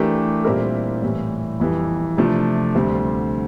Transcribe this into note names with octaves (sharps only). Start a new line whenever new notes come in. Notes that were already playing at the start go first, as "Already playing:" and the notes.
Already playing: E3 A3 D4 G4 A#4
A#2 G3 C4 E4 A#4
A2 E3 G3
F2 E3 G3
C3 F3 A3 D4
D2 D3 G3 C4